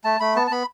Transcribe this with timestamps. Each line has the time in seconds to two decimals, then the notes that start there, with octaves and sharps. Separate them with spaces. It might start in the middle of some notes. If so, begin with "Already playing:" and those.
0.04 A3 A5
0.20 A3 B5
0.35 B3 A5
0.47 A5
0.51 B3 B5